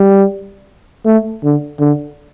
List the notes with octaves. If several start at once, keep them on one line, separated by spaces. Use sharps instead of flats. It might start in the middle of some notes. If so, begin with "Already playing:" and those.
Already playing: G3
A3
D3
D3